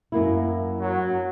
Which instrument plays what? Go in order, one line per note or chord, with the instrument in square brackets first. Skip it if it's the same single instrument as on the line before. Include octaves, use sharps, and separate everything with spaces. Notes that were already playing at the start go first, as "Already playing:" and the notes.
[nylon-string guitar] F#2 A#3 E4
[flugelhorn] F#3